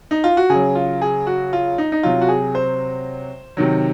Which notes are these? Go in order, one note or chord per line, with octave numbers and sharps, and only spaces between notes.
D#4
F4
F#4
C#3 F#3 G#4
F4
G#4
F#4
F4
D#4
D#4
C3 F#3 F4
F#4
G#4
C5
C3 D#3 F#3